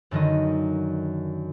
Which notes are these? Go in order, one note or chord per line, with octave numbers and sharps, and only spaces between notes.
F#2 D3 D#3 D#5